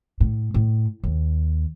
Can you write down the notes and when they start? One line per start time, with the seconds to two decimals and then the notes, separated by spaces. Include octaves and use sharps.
0.20 A2
0.54 A2
1.04 D#2